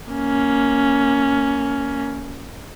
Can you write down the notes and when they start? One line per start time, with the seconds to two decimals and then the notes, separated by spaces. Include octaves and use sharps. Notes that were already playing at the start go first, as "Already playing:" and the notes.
0.12 A#3 C#4